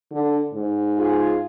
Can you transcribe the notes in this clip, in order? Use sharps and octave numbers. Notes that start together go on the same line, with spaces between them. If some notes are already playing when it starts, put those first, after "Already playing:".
D3
G#2
F4 G#4